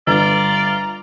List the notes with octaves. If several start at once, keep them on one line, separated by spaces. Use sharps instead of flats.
G1 F4 D5 A#5